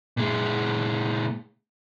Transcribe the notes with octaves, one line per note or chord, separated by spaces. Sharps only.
A#2 G#3